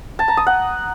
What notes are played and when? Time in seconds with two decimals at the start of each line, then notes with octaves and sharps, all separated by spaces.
0.19 A5
0.28 A#5
0.37 D#6
0.47 F#5